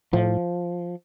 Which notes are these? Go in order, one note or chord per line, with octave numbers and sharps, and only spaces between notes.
A2 F3